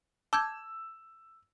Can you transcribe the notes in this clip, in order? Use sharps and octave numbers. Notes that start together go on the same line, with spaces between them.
A5 D6 E6 G6 G#6